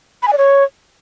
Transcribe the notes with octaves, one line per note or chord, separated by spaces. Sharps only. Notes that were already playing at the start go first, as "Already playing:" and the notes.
B5
G#5
D5
C#5